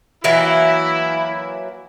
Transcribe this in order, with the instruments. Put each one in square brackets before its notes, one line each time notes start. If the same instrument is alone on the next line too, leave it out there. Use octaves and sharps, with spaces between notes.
[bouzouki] E3 F#3 A#3 [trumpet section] E4